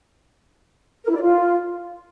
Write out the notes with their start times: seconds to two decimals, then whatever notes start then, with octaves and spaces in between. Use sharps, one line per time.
1.05 A#4
1.10 E4
1.16 D5
1.21 F4